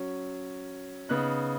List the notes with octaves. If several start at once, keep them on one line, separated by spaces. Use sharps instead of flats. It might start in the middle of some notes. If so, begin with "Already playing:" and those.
Already playing: F#3 C#4
C#3 B3 D#4 F#6